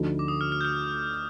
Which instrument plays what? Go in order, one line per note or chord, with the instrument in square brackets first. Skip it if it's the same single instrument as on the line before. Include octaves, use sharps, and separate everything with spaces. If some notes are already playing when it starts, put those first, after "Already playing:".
Already playing: [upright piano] D2 D3 F3 A3 D#4
[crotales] D6
D#6
F6
F6
G6
F6